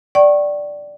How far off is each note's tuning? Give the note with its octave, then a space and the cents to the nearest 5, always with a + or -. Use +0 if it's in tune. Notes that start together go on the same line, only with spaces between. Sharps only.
D5 +0 G5 -40 C#6 -20